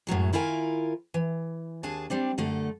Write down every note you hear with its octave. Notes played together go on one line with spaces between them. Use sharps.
F#2 A2 F#3 G#3
D#3 E4 F4 A#4 G#5
E3
D#2 D4 G#4 G#5 A5
G3 C4 D4
F#2 D3 A3 A4